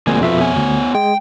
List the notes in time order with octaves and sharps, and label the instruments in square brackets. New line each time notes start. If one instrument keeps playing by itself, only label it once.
[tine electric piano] D2 A#2 G#5 [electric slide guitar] F3 G#3 C4
[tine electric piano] F2 B2 E5 [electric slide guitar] C4 F4 B4
[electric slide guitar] B3 C#5 G#5
[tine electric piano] D2
[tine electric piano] G#3 [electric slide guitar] G5